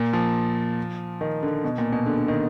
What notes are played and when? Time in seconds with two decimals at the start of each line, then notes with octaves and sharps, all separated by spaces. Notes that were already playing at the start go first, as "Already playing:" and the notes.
Already playing: A#2
0.13 F3
1.21 D#3
1.43 D3
1.64 B2
1.78 A#2
1.93 B2
2.06 D3
2.18 D3
2.28 D#3